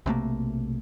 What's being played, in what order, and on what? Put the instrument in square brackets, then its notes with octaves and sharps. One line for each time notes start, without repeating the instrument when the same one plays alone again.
[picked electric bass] B1 C3 A3 A#3